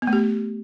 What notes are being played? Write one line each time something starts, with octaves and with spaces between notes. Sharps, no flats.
B3
A3
G4